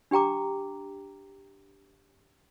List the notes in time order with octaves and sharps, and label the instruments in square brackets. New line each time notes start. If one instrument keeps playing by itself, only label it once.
[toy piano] D4 G4 G5 A#5 D6